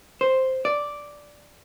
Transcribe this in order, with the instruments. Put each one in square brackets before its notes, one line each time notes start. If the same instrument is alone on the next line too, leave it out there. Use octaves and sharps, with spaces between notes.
[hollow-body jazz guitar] C5
D5